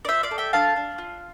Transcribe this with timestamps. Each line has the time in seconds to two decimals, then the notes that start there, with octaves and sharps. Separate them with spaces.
0.05 D5
0.08 F4 C5 E5
0.23 D5 F5
0.31 A4
0.38 E5 G5
0.53 D4 F5 A5
0.76 D4
0.98 F4